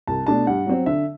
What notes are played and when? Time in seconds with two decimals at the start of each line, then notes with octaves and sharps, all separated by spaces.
0.07 C2 A5
0.27 B2 A3 D4 A5
0.47 G2 F#5
0.66 F#3 C4
0.86 D3 E5